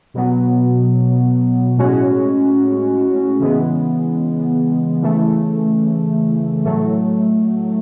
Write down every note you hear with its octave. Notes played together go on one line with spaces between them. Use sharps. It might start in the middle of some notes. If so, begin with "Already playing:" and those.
B2 F#3 B3
A2 G#3 C#4 F#4
C#3 E3 G#3 B3
C#3 E3 A3
A2 F#3 A3